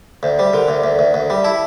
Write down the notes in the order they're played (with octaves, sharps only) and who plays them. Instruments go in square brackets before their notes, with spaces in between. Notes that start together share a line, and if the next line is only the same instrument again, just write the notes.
[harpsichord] D2 [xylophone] C5
[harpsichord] G3 [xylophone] C5
[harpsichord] D3 [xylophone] A#4
[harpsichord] D2 [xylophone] C5
[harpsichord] D2 [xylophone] E5
[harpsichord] D2
D2
G3
[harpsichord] E4 [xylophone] A5